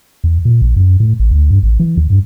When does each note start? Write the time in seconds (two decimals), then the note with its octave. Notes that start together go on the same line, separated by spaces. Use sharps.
0.24 E2
0.45 A#2
0.62 A#1
0.76 F#2
1.00 A2
1.20 A1
1.31 D2
1.50 G2
1.63 A1
1.80 E3
1.97 D#2
2.10 G2